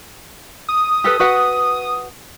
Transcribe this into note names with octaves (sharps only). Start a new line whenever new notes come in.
D#6
G4 A4 B4
F#4 B4 F#5